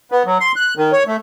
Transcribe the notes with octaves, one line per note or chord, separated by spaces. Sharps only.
B3
F#3
C6
F#6
D#3
C#5
A3